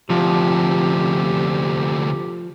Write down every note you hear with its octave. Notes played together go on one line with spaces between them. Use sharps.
D2 C3 F3 G4